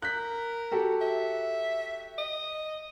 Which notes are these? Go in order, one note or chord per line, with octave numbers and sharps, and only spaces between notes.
A#4 F#6 G6 B6
F#4 G4 A4
E5
D#5